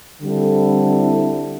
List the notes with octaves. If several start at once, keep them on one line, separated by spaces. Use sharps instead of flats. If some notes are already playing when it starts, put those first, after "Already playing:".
D3 G3 C4 E4 A4